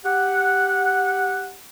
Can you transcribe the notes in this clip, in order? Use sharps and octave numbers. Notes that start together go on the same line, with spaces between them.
G4 F#5